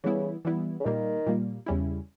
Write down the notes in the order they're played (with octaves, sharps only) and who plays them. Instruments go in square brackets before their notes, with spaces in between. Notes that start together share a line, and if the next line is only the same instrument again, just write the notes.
[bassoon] C#3 [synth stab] E3 G3 B3 E4
[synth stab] E3 G3 B3 E4
[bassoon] C#3
[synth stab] A#2 G3 A#3 [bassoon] D#3
[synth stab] A#2 G3 A#3
E2 C#3 G3 C#4 E4